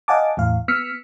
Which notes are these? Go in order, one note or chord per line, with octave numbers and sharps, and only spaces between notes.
D#5 F5 F#5 G#5 A5 D6
E2 A2 F5
B3 E6 F6 B6 C#7